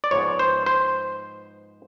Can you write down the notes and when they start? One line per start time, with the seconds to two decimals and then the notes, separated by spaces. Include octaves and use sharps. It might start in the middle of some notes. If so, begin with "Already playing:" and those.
0.04 D5
0.11 G#2 F3 G#3 B3 C#5
0.39 C5
0.66 C5